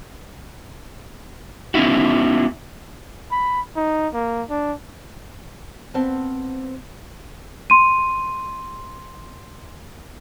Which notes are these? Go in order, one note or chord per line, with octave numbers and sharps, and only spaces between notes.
B3 C#4 D#4 E4 F#4
B5
D#4
A#3
D4
B3 C4 C5 F5 F#5 A5
C6 D#7